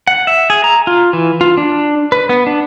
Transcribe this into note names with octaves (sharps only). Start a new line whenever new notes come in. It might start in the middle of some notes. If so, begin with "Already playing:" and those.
F#5
E5
G#4
A#5
F4
E3
F4
D4
B4
B3
D4